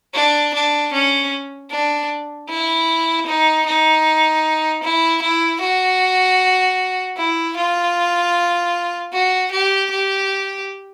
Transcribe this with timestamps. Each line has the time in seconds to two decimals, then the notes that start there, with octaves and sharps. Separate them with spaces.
0.14 D4
0.54 D4
0.93 C#4
1.71 D4
2.49 E4
3.27 D#4
3.66 D#4
4.83 E4
5.22 E4
5.61 F#4
7.18 E4
7.57 F4
9.13 F#4
9.52 G4
9.91 G4